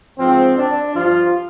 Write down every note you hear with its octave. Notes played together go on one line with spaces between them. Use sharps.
G#2 F3 C4
D4
G2 F3 F4